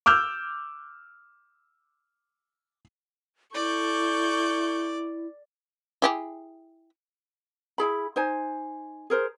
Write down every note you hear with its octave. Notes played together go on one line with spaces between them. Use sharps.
D6 E6 F6 G6
E4 A4 D5 C#6 G6
E4 G4 G#4
E4 G#4 B5
D#4 C5 G#5
G#4 A#4 C5